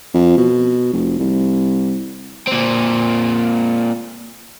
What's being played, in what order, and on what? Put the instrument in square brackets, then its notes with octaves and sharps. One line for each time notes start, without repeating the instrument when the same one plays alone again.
[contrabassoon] F2
B2
F1
C2
[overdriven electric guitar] A#2 C4